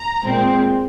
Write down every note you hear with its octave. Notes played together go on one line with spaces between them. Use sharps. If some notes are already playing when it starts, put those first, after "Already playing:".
Already playing: A#5
A#2 G#3 C4